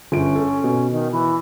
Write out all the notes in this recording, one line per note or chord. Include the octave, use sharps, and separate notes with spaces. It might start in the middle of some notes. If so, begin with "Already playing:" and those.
G1 C#4 D7
A4
B2
D#3
E3